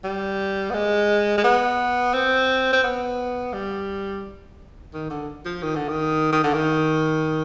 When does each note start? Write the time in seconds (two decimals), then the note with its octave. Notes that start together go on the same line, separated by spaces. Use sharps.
0.04 G3
0.70 B3
0.74 G#3
1.37 G#3
1.44 B3
2.13 C4
2.73 C4
2.83 B3
3.53 G3
4.93 D#3
5.10 D3
5.45 F3
5.62 D#3
5.75 D3
5.89 D#3
6.32 D#3
6.43 D3
6.54 D#3